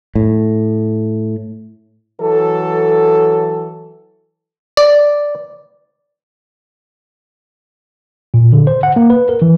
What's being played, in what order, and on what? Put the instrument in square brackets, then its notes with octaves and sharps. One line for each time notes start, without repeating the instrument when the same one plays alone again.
[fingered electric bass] A2
[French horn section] E3 F#3 A4
[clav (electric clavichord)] D5
[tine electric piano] A#2
D3
C5
F#5
A#3
B4
A#4
E3